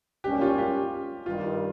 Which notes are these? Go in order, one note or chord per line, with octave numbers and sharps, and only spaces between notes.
G#2 G3 A#3 C#4 G4
F4
G4
G2 D#3 G3 F4